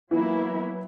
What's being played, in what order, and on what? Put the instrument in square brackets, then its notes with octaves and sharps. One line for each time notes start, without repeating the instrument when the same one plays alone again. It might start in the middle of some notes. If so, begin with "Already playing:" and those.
[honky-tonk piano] E3 B3 [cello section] F#3 A#3 E4